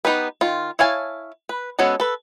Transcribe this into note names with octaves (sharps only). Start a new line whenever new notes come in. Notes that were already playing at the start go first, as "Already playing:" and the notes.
B3 D#4 G4 B4
D#3 F4
E4 C#5 F5 G#5 A5
B4
G#3 B3 C#4 F#4 A4
A4 B4